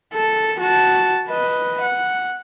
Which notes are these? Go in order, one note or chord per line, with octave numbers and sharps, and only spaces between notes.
A4
F#4 A5
B4 D#5
F#5